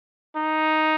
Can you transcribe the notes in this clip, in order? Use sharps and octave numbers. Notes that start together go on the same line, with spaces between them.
D#4